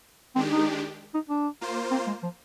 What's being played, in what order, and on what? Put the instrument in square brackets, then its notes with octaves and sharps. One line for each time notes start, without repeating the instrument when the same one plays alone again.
[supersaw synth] D#3 G#3 D4 G4 [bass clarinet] C4
[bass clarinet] D#4
D#4
D4
[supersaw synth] A#3 F4 C5
[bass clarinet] C4
G#3
F3